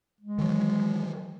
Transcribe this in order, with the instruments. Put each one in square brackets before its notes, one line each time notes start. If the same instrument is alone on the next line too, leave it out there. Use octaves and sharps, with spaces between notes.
[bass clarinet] G#3
[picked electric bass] D#3 E3 F#3